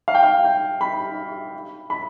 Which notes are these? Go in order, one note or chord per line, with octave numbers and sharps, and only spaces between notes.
F5
G5
F5
G5
B5
B5